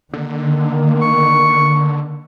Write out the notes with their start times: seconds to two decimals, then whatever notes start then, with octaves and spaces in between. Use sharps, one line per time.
0.14 D3 D#3 A#3
1.02 C#6